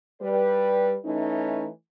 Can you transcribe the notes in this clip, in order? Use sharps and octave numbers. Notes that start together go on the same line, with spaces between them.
G3 B4
E3 A3 C#4 D#4